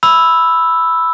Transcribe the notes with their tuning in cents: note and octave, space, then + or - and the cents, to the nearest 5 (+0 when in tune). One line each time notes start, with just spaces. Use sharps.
B5 +5 E6 +0